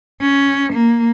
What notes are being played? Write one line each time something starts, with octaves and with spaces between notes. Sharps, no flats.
C#4
A#3